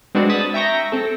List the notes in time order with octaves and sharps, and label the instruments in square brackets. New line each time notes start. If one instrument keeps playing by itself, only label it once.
[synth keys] G#3 C4 D4 F#4 B4 D5
A5 B5 D#6 G#6 A6 B6
E5 G5 A#5 C#6 G6 A#6
C4 A4